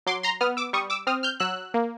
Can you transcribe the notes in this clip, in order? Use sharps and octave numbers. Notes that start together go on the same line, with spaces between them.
F#3 C6 D6
A#5 C6
B3 D#6 F6
D6 E6
G3 C#6 D#6
D6 E6
C4 D#6 F6
F6 G6
F#3 E6 F#6
A#3